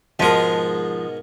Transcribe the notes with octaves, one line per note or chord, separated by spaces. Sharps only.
G#2 B2 F3 G#3 A#4